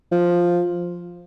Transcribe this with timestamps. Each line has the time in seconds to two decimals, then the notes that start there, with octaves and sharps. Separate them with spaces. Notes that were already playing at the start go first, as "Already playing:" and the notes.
0.12 F3